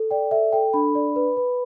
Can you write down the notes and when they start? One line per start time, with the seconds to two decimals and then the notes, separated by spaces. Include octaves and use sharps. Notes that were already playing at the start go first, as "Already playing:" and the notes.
Already playing: A4
0.11 D5 G5
0.31 A4 E5
0.52 A4 G5
0.73 D4 B5
0.95 D5
1.16 B4
1.37 B4